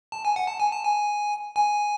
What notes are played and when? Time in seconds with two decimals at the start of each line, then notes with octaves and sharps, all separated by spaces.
0.12 A5
0.25 G#5
0.36 F#5
0.47 A5
0.60 G#5
0.72 A5
0.84 G#5
1.56 G#5